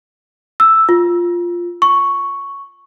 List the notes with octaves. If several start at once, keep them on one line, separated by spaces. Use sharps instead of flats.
E6
F4
C#6